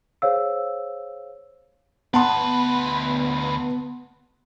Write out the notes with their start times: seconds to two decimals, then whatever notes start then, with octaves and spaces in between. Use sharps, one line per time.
0.22 G#4 C5 C#5 F5 E6
2.14 D2 B3 B4 F#5 A5 C6